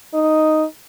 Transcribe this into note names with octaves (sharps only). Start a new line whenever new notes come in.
D#4